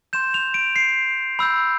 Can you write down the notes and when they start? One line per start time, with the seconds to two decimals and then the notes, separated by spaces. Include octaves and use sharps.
0.13 C6 G6 E7
0.34 F7
0.54 D7
0.76 C7
1.39 B5 E6 G6